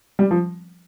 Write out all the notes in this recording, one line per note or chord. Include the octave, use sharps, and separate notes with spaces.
G3
F3